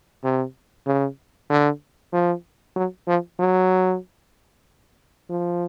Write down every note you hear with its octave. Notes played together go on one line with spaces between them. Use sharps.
C3
C#3
D3
F3
F#3
F3
F#3
F3